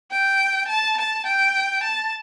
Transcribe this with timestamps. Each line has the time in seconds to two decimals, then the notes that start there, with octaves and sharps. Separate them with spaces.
0.11 G5
0.68 A5
0.98 A5
1.26 G5
1.84 A5